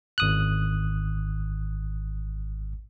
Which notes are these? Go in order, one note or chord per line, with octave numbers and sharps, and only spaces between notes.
G#1 D#6 F#6